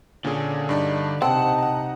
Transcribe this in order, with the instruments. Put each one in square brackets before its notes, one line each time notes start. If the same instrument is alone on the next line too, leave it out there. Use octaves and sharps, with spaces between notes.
[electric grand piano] A#2 C#4 G#4 [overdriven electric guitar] D3
[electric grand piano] G2 D4 D#4
[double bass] C3 D#4 [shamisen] C4 [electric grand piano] F#5 [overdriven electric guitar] A5
[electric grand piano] F#5 A#5